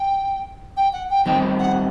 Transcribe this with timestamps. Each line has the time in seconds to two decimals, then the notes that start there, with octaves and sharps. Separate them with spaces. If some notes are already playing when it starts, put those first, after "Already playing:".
Already playing: G5
0.77 G5
0.93 F#5
1.10 G5
1.26 D#3 G3 C4 D#4 G4 G5
1.59 F#5